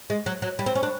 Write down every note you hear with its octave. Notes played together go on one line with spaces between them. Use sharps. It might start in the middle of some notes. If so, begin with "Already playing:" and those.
G#3
F#3
F#3
G3
C4
C#4
D4